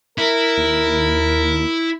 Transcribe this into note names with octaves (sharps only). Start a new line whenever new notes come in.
E4 A#4
D#2